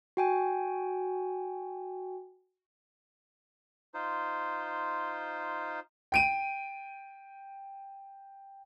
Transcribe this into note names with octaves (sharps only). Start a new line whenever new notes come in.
F#4 G5 G#5
D#4 F4 C5
G5 D7 D#7